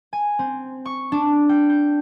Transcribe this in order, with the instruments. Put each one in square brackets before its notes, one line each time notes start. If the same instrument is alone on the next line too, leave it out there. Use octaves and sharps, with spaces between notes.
[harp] G#5
C4
C#6
D4
G5
G6